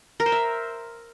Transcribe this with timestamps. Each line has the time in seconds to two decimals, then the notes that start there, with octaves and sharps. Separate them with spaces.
0.20 A#4
0.26 C5
0.32 E5